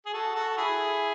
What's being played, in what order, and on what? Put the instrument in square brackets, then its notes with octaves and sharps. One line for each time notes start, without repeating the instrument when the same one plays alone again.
[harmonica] G#4
F#4 A4
F#4 A4
E4 G#4